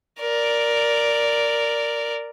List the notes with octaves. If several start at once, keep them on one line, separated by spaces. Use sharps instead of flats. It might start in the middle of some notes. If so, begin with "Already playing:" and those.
A#4 D5